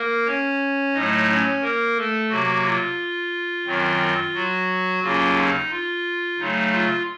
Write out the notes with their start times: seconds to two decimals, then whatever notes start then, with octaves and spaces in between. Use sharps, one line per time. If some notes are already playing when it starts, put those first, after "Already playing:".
Already playing: A#3 A#4
0.26 C#4 C#5
0.94 A2 F#3 A3 D#4 D#5
1.28 C#4 C#5
1.62 A#3 A#4
1.96 A3 A4
2.29 C3 F#3 A#3 F#4
2.64 F4
3.66 F#2 D#3 F#3 C4
4.34 F#3 F#4
5.02 D#2 C#3 F#3 A#3 C#4 F4
5.36 D#4
5.70 F4
6.38 C#3 F#3 A3 D#4
6.72 F4